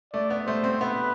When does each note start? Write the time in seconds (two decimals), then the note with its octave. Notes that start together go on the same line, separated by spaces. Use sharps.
0.13 A3 D5
0.30 B3
0.47 A3 C5
0.64 C4
0.81 B3 B4